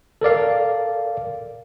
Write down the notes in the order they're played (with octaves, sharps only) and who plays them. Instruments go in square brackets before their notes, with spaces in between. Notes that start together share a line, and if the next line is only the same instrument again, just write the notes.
[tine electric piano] A4 A#4 D5 F5